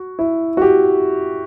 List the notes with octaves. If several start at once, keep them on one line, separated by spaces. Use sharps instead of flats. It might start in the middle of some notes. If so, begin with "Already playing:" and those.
Already playing: F#4
E4
F#4
G4